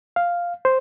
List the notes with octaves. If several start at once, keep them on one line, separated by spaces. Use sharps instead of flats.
F5
C5